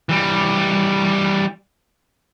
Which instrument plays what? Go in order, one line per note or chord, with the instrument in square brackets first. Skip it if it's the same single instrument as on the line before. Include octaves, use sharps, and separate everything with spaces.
[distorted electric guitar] E3 G3